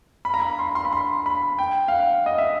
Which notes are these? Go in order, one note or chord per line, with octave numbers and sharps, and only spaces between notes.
B5
A#5
B5
C6
C6
B5
C6
B5
G5
F5
F#5
D#5
E5